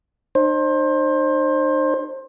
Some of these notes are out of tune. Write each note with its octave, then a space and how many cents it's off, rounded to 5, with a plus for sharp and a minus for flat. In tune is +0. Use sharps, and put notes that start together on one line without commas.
D#4 -45 C5 +25